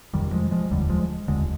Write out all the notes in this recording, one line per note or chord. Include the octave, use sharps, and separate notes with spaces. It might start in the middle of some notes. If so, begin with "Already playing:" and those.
G1 F2 C3 D#3 G3
F3 G#3
F3 G#3
F1 D#2 D3 G3
F3 G#3
F1 D#2 D3 G#3